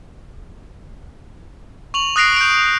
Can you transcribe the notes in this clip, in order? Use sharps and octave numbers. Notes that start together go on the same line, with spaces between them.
C#6 F7 F#7
D#6 F#6 A#6 C7 D7
G6 D7